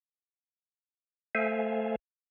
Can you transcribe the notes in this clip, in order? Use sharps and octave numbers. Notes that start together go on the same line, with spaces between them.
A3 A4 C5 E5 F5 G#5